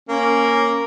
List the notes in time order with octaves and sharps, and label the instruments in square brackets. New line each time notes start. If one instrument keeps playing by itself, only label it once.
[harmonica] A#3 [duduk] C#4